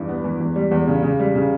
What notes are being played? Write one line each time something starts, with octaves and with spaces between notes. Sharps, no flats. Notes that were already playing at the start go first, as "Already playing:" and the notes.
Already playing: E2 G2 E4
B3
E3
E2
G3
E2
C#3
C#3
G3
C#3